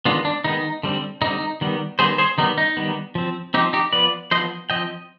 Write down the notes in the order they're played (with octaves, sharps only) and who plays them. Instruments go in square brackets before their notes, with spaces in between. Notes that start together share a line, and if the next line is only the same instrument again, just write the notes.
[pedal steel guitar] D#3 G#3 B3 D4 F4
D4
D#3 G#3 B3 D#4
D3 G3 C4
D3 G3 C4 D#4
D#3 G3 B3
D#3 G3 B3 G#4 C5
G#4 C5
D#3 G3 B3 D#4
D#4
D#3 G3 B3
F3 C4
F3 C4 D#4 G4
D#4 G4
F3 B3 B4 D5
F3 C5 D#5
B3
F3 C4 D#5 G5